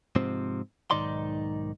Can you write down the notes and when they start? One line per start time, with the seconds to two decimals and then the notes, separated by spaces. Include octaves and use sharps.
0.16 G#2 C3 F3 C4
0.91 B1 G#2 D#3 D#4 D5 C6